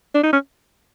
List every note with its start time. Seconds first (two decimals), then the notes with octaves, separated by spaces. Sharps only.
0.14 D4
0.23 D#4
0.33 C#4